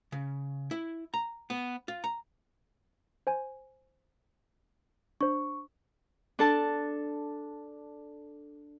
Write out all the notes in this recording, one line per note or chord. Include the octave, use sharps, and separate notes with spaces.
C#3
E4
A#5
B3
F4
A#5
C5 G#5
D4 C5 C#6
D4 A4 A5